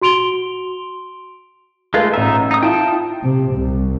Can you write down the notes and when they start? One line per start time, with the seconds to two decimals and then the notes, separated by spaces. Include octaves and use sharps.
0.01 F#4 C6 D7 F7 G7
1.94 G#3 A3 F4 A4 B4 F5
2.14 A1 D#4 E5 A#5
2.51 D#4 D#6
2.63 E4 F4 G5 A5
3.24 C3
3.55 C2